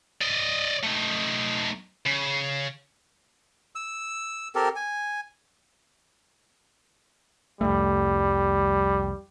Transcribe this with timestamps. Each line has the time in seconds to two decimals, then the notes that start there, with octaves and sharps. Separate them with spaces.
0.22 D5 D#5
0.83 A3 D#4
2.06 C#3
3.75 E6
4.55 C4 G4 A4 A#4
4.76 G#5
7.61 C2 F2 G3 A3